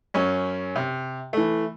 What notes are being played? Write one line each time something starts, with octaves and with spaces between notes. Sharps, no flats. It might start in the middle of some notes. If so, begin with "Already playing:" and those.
F#2 C#4
C3
E3 A3